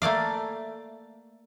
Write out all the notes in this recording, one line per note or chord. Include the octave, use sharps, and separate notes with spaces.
A3 A#3 D5 F5